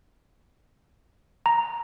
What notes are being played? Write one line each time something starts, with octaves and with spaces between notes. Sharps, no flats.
A#5